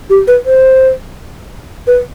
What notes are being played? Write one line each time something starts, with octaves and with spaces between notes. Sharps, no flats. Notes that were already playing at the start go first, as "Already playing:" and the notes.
G4
B4
C5
B4